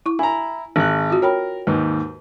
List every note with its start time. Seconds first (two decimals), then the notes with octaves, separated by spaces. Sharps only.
0.06 E4 C#6
0.19 E4 G#5 A#5
0.76 G#1 F#6
1.10 F4 F#4
1.22 A#4 C#5 G5 B5
1.67 D#2 G#2 B4